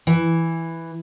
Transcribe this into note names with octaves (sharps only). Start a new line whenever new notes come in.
E3